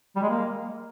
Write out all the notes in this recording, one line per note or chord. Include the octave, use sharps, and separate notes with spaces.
G3
G#3
A#3